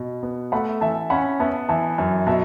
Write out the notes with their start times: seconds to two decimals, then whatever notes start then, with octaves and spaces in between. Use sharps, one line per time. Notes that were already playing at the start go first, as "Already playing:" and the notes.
Already playing: B2
0.23 B3
0.52 A3 F#5 B5
0.81 E3 E5 A5
1.10 C#4 F#5 B5
1.40 B3 E5 A5
1.69 E3 E5 A5
1.98 F#2
2.27 B2 E5 A5